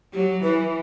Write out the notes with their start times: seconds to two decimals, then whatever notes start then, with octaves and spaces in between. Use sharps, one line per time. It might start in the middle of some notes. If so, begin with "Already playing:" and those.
0.13 F#3 G4
0.43 E3 B4